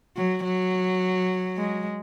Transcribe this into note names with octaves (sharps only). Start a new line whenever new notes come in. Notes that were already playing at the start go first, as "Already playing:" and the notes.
F#3
F#3
G#3